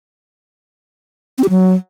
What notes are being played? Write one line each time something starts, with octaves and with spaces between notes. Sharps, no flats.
C4
G4
F#3